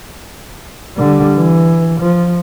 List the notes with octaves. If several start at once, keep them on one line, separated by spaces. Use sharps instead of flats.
D3 G3
E3
F3